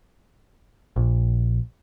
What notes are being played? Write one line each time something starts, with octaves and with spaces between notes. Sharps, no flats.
A#1